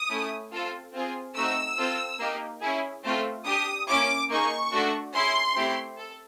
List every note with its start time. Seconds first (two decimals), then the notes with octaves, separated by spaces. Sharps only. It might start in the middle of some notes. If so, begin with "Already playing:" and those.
Already playing: D#6
0.10 A3 C#4 E4
0.52 C4 F4 A4
0.93 C4 F4 G#4
1.36 A3 C4 D#4 F#4 E6
1.78 C4 F4 A4
2.19 A#3 D#4 G4
2.61 C#4 E4 G#4
3.04 A3 C4 F4 A4
3.46 D4 G4 D#6
3.88 A#3 C#4 E4 D6
4.29 A#3 D#4 G#4 C#6
4.72 A3 D4 F#4 A4
5.14 C#4 E4 G#4 C6
5.56 A3 C4 E4 G4
5.97 A4